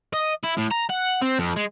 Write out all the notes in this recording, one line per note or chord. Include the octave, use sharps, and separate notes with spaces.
D#5
E4
A2
A#5
F#5
C4
F2
G#3